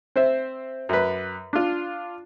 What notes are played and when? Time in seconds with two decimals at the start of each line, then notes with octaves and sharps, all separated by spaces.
0.16 C4 C5 E5
0.89 F#2 B4
1.53 D4 F4